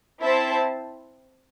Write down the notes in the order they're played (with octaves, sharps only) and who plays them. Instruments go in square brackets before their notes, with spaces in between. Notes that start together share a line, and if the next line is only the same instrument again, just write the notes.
[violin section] C4 E4 C5 E5 A5